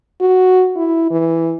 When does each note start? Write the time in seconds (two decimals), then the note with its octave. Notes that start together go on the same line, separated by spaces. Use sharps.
0.21 F#4
0.76 E4
1.11 E3